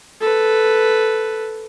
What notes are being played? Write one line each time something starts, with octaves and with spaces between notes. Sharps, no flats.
A4 B4